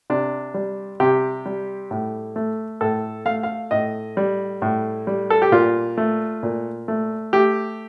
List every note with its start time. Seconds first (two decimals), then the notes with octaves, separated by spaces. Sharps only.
0.10 C3 D4
0.54 G3
1.00 C3 G4
1.46 G3
1.91 A2
2.36 A3
2.81 A2 A4
3.26 A3 F5
3.43 F5
3.71 A2 D#5
4.17 G3
4.62 A2
5.07 G3
5.30 A4
5.42 G4
5.52 A#2 F4
5.97 A3
6.43 A#2
6.88 A3
7.33 A3 G4